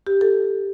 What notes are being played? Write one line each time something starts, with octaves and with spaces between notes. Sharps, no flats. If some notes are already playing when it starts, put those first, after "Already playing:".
G4
A4